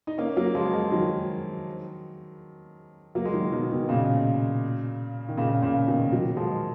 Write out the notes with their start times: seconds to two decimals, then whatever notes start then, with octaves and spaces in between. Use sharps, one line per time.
0.07 D#4
0.18 A#3 C#4
0.37 F#3 A#3
0.55 F3 G#3
0.73 F3 G#3
0.92 D#3 F#3
3.15 F#3 A#3
3.25 G#3
3.33 D#3 F#3
3.52 B2 D#3
3.71 B2 D#3
3.89 A#2 C#3
5.29 D#3
5.37 A#2 C#3
5.62 A#2 C#3
5.87 B2 D#3
6.12 D#3 F#3
6.37 F3 G#3